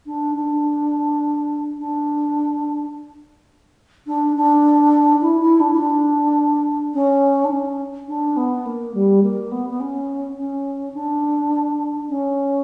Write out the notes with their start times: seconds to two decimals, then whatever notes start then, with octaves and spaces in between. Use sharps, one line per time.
0.06 D4
0.35 D4
1.78 D4
4.07 D4
4.36 D4
5.21 E4
5.41 E4
5.60 D4
5.73 E4
5.79 D4
6.94 C#4
7.44 D4
7.51 C#4
8.08 D4
8.36 B3
8.65 A#3
8.94 G3
9.23 A#3
9.51 B3
9.69 B3
9.80 C#4
10.37 C#4
10.94 D4
12.09 C#4